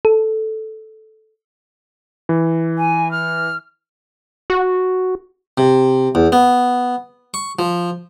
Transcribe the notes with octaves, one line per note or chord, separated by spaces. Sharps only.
A4
E3
G#5
F6
F#4
C3
E2
B3
C#6
F3